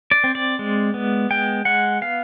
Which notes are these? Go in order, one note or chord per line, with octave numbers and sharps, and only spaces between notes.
D5
C4
D5
G#3
B3
G#3 G5
G#3 F#5
B3 F5